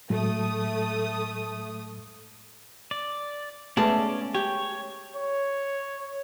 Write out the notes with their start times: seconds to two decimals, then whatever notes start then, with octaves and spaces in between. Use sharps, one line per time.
0.10 A2 F#3 G#3 A3 D#6
2.91 D5
3.77 G#3 A3 B3 C#4 G#4 D5 A5
4.35 G4 C#5
5.16 C#5